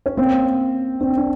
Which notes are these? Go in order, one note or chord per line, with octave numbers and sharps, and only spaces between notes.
C#4
A#3 C4
C4 D4
D4